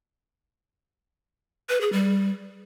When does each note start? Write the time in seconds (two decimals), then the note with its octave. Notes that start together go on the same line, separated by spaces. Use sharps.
1.69 B4
1.81 G#4
1.92 G3